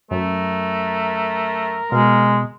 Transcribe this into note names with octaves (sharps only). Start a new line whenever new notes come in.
F#2 A3 A#4
B2 G#3 F5